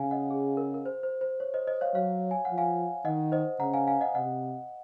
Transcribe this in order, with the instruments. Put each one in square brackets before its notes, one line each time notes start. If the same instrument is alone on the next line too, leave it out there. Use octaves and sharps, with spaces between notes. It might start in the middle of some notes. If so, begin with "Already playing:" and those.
Already playing: [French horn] C#3 [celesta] F5 G#5
[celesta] D#5 F#5
G#4
A#4
A#4
C5
C5
C5
C#5
C5 D#5
C5 D#5
C#5 F5
[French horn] F#3 [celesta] C#5 F5
[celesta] G#5
[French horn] F3 [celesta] F#5
[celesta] F5 G#5
[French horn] D#3 [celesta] D#5 F#5
[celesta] C5 D#5
[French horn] C#3 [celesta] F#5 A#5
[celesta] F5 G#5
F5 G#5
D#5 F#5
[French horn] C3 [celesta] D#5 F#5